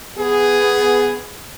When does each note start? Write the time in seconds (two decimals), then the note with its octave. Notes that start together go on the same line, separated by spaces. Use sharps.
0.18 B3 G#4